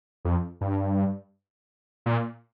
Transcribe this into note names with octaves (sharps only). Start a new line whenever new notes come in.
F2
G2
A#2